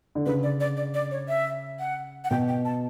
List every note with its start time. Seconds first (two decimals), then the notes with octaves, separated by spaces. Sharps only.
0.15 D3
0.26 C#3 B4
0.43 D5
0.60 D5
0.77 D5
0.94 D5
1.11 C#5
1.28 E5
1.79 F#5
2.24 F#5
2.31 B2 G5
2.48 G5
2.65 A5